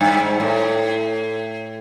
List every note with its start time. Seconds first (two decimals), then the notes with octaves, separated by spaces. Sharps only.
0.01 G2
0.20 G#2
0.40 A2